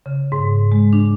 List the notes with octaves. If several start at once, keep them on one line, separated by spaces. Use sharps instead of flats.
C#3
G#2
G#3
D4